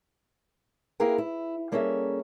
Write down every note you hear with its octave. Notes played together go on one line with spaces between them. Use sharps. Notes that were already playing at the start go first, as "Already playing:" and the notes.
A#3 E4 G#4 A#4 B4 G5
E4
G3 A#3 C#4 G#4 A4 E5